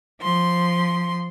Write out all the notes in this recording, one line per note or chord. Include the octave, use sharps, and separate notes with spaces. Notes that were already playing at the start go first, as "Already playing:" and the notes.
F3 C6